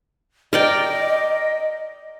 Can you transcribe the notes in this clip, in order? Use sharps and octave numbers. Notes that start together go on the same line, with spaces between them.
A#4 D5 D#5 G5